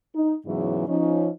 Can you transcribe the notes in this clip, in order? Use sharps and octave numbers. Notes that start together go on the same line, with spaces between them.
D#4
E2 G#2 C#3 E3 F#3 E4
F3 C#4 D#4